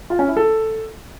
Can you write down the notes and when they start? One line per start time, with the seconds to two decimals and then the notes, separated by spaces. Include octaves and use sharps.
0.10 F4
0.19 C#4
0.28 E4
0.37 A4